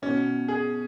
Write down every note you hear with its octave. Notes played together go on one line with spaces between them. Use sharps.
B2 C#4
G#4